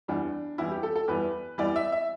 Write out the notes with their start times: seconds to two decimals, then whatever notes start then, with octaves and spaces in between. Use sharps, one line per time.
0.08 E2 E3 G3 D4
0.58 E2 E3 G3 E4
0.71 G4
0.83 A4
0.96 A4
1.08 E2 E3 G3 B4
1.58 E2 E3 G3 D5
1.76 E5
1.92 E5